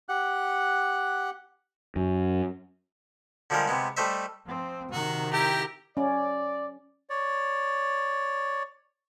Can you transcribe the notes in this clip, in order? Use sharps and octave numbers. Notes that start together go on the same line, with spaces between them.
G4 F#5 F#6
F#2
D3 F3 G3 G#3 A#4
C3 G#3 B3
G3 A3 C5 D#5 E5
F3 C4
C3 D#3 F#4
E4 G4 G5 A#5
C#4 D5
C#5 D5